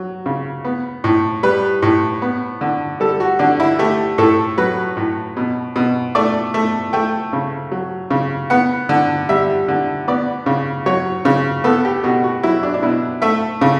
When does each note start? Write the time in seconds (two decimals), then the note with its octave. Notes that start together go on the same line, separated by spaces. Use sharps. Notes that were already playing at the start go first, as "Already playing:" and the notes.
Already playing: F#3
0.26 C#3
0.65 B3
1.04 A2
1.43 G3 B4
1.82 A2
2.22 B3
2.61 D3
3.00 G3 A4
3.20 F#4
3.39 D3 D4
3.60 E4
3.79 A3 G4
4.18 A2 A4
4.58 F#3 B4
4.97 A2
5.37 B2
5.76 B2
6.15 A3 D5
6.54 A3
6.93 A3 G5
7.33 C#3
7.72 F#3
8.10 C#3
8.50 B3 F#5
8.89 D3
9.29 G3 E5
9.68 D3
10.08 B3 D5
10.46 C#3
10.86 F#3 C#5
11.25 C#3
11.64 B3 A4
11.85 G4
12.04 B2 F#4
12.24 F#4
12.43 F#3 E4
12.63 D4
12.74 D4
12.83 B2 E4
13.22 A3 E5
13.61 C#3